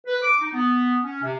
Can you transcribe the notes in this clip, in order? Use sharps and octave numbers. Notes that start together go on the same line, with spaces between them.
B4
D6
D#4
B3
C#4
C3